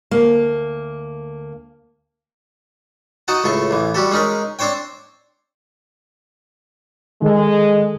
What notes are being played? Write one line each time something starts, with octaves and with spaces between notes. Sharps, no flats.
D2 A#3
D#4 F#4 D#5 F#5 A5
C#2 A2 A4 C#6
A1 E3
G3 F#4 G4 A4
G#3 C#4 D#4 A#4
C4 D4 C5 C#5 G5
D#3 G#3 A4